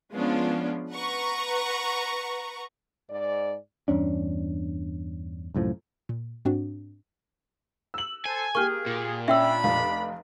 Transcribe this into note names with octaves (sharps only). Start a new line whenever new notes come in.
F3 G#3 B3 C#4 D4 F4
B4 F#5 A#5 C#6
G#2 D5
E2 G2 C#4 D4
C2 F#2 A2 F3
A#2
G#2 C4 D4 F#4
E6 F#7
A4 C5 G#5
A#3 G4 G#4 C#6 F6
A#2
C#4 D4 E5 G5 B5 E6
F1 F5